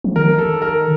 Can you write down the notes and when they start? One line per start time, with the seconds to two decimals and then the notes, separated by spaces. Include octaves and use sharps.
0.04 F3
0.16 D#3 A#4
0.38 A4
0.62 A#4